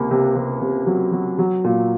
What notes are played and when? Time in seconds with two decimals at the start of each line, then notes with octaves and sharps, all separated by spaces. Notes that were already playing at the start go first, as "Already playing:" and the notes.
Already playing: C#2 C3 A#3
0.11 C3
0.35 C3
0.61 C3
0.87 F#3
1.12 F#3
1.39 F#3
1.64 A#2